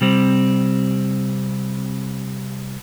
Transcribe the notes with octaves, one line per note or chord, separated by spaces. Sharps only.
C3 G3 C4